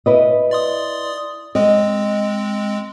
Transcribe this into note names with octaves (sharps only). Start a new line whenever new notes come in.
E4 B4 D#5
D5 C6 D#6
G#3 C4 D#5